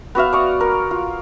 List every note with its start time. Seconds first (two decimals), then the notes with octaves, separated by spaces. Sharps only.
0.15 B3 F#4 E5 F5
0.33 D5 C#6 D#6
0.60 A#4
0.91 F4